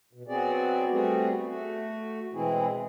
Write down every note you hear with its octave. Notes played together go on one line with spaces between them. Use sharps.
B2
F#3 B3 C4 F#4 G#4 D5
G3 A3 B3 C4 F#4 G#4
A3 F#4
B2 E3 G#3 C4 E4 G#4